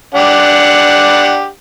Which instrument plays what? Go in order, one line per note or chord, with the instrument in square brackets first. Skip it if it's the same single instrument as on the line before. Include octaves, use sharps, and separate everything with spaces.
[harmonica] D4 G4 F#5